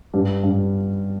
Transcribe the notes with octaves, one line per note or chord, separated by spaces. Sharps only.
G2 G3
G2